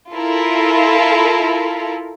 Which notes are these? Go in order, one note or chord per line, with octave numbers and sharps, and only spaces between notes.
E4 F4 A4 A#4